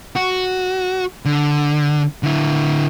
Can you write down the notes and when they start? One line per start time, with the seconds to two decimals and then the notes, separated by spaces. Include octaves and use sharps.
0.16 F#4
1.25 D3
2.23 D3 E4